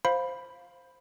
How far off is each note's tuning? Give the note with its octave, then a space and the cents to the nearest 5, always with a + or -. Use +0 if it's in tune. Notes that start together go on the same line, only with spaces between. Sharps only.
C5 +0 F5 +10 B5 +0